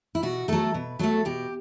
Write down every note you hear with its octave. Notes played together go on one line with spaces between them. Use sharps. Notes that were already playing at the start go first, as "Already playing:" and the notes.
E4
B2 F#4
F#3 A3 A4
B2 B4
F#3 A3 A4
B2 G4